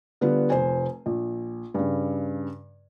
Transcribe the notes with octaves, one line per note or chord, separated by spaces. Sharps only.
D3 G3 B3 F4 B4
F1 C5 G#5
A#1
G2 C#3